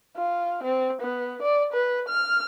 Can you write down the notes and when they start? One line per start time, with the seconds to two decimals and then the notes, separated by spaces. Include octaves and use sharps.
0.17 F4
0.64 C4
1.01 B3
1.42 D5
1.73 B4
2.08 F6